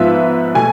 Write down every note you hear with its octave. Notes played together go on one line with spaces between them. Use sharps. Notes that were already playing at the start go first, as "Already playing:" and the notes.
Already playing: G#2 F3 B3 F4 B4 E5
B2 A3 G#5